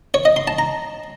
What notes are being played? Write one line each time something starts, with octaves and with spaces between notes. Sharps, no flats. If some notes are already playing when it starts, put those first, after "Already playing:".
C#5
D#5
C6
A5
A#5